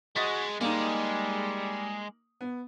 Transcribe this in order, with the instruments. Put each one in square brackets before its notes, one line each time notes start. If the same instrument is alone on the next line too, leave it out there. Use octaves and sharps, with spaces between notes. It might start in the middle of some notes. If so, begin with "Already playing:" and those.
[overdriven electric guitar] G#3 [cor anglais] F#4 [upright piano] D#5 A6 B6
[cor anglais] G3 [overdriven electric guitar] G#3 [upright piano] A#3 D#4
[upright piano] B3